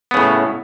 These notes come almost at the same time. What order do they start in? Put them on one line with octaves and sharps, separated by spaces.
B3 C#3 A2